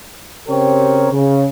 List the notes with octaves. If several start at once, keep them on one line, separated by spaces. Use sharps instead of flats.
C#3 C4 G4 A#4 C#5
C#3